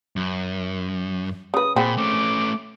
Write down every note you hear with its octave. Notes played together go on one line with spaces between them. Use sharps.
F#2
C#3 B4 D#6
A#2 C4 G#4 B5
A3 C#4 D6